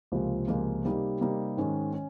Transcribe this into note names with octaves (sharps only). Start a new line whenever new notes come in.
C#2 C3 F3 A#3 F4
C#2 C3 F3 A#3 F4
C3 G3 A#3 D#4
C3 G3 A#3 D#4
G#2 D#3 G#3 C#4
C#4